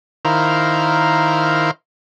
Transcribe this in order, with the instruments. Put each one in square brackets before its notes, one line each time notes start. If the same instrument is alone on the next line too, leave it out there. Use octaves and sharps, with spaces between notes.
[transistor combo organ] D#3 E4 A#4 C5 F5